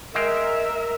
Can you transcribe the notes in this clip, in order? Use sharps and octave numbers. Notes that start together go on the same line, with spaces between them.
G#3 A#4 E5 F5 G5